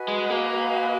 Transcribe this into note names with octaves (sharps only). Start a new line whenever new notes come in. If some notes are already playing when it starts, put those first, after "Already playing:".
Already playing: F#4 B4 D#5 G#5
G#3
A#3